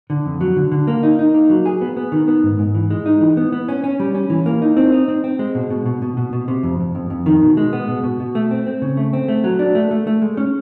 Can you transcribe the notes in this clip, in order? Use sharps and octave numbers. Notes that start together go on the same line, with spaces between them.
D3
F2
F#3
D3
D3
A#3
D#4
D#4
A#3
F#3
G#4
B3
B3
D#3
B3
G#2
G#2
E3
G#3
D#4
E3
B3
B3
C#4
C#4
G3
C#4
E3
A#3
D#4
C4
D#4
C4
C4
G#3
B2
B2
B2
B2
B2
B2
C3
F2
F2
F2
F2
D#3
B2
G#3
B3
B2
B2
B2
A3
C4
C4
C#3
A3
C4
A3
F#3
D4
A3
A3
A3
G#3
C#4